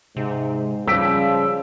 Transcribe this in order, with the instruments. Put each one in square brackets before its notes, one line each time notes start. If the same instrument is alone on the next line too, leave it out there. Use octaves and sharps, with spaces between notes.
[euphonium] G#2 [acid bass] C3
[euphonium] C#3 [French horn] F3 [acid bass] G3 [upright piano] E6 B6 D7